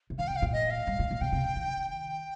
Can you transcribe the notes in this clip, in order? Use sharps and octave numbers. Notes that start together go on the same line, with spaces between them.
C3
D#3 F5
C3 G5
F5
A#2
D#5
F5
G2
A#2
A#2
C3 G5
C3
C3
D#3
G5